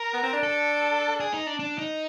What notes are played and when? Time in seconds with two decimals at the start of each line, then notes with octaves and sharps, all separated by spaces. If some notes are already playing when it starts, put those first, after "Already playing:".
Already playing: A#4
0.14 B3
0.23 C4
0.33 D4
0.43 A4
1.20 G#4
1.33 D#4
1.47 D4
1.59 D4
1.78 D#4